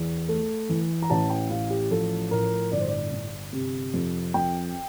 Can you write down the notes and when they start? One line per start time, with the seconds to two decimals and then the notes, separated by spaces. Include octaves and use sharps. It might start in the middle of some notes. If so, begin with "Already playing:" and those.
Already playing: E2
0.29 A3
0.69 E3
1.02 A#5
1.10 A1 A5
1.30 G5
1.50 A1 F5
1.70 G4
1.90 F3 A4
2.31 A2 A#4
2.72 G1 D5
2.80 C5
2.88 D5
3.12 G1
3.53 C3
3.94 F2
4.34 F2 G5